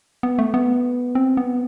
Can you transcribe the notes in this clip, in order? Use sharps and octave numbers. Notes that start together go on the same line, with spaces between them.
B3
A3
B3
C4
B3